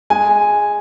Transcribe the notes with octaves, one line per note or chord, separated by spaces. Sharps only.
G#3 G#5